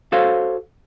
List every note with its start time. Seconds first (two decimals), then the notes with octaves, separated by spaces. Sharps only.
0.12 F#4 A4 C5 C#5 F5